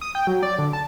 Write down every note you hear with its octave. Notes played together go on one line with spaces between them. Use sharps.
D#6
G5
F#3
D5
D3
A5